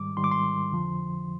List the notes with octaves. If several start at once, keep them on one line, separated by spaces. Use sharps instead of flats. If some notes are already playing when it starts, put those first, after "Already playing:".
Already playing: G#2 D#3 G3 D6
G#2 D#3 G3 C6
D6
C6
F2 D3 F3